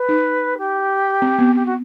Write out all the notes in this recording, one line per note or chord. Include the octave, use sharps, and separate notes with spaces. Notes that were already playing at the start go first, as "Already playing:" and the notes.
Already playing: B4
D#4
G4
C4
B3
G4
F#4